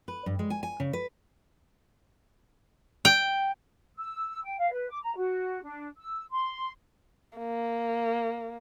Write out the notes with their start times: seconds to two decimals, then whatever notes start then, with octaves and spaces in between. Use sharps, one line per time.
0.08 B4
0.26 G2
0.39 G#3
0.50 G#5
0.63 G#5
0.80 C#3
0.93 B4
3.05 G5
3.96 E6
4.43 G5
4.59 F5
4.71 B4
4.89 D6
5.02 A#5
5.15 F#4
5.62 D4
5.97 E6
6.30 C6
7.38 A#3